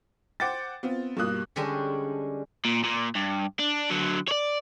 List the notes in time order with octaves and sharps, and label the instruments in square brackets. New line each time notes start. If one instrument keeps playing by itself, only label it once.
[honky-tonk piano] C5 F#5 G5 D6 A6
B3 C4 F4
G2 B2 G3 A#3 D#6 F#6
[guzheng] D3 G3 G#3 C#4 D4
[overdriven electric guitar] A#2
A#2
G2
D4
D3 F#3
C#5 D5